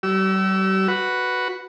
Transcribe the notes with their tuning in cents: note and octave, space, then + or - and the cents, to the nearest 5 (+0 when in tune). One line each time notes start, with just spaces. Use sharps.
G3 -40 G4 -45 E6 +0
F#4 +0 B4 +0